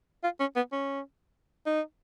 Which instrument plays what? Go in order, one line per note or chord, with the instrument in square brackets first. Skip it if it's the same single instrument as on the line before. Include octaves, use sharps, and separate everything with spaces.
[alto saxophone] F4
C#4
B3
C#4
D#4